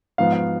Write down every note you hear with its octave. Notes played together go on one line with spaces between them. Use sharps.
G#2 F3 B3 F5
F5